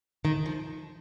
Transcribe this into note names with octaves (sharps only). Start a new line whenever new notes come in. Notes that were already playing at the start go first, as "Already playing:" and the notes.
D#3
F3